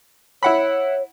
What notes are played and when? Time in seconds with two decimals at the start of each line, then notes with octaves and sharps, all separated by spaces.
0.43 E4 C#5 F#5 B5